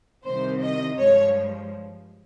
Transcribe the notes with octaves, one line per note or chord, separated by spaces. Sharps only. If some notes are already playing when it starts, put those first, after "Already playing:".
C2 C3 D#3 C5
D#5
G2 F3 G#3 C#5